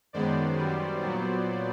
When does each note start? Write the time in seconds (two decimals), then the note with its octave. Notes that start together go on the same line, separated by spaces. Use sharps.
0.13 F#2 D#3 G#3 B3 C5 D5
0.57 F#2 D#3 G3 B3
1.01 A#2 F#3 B3